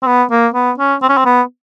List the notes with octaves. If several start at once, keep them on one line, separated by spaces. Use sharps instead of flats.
C4
B3
A#3
B3
C#4
C4
C#4
C4
B3